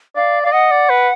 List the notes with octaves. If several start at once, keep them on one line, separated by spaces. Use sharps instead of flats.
D5 F5
D5 F5
D#5 F#5
D5
B4